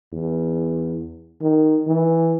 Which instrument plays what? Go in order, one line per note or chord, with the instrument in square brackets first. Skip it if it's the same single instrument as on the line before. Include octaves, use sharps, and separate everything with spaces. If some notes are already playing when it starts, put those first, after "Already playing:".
[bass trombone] E2
D#3
E3